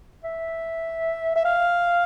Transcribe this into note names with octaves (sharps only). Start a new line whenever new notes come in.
E5
E5
F5